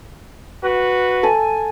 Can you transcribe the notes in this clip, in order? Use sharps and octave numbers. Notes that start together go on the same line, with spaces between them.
F#4 B4
A4 G#5